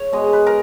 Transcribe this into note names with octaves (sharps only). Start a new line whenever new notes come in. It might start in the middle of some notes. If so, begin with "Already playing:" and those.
Already playing: C#5
B2 G#3 D#5
B4
A#4